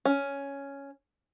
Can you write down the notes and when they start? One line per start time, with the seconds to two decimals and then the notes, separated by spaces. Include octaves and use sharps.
0.05 C#4